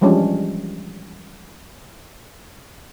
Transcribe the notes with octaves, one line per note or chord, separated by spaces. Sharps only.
E3 F3 G3 G#3 C#4 D4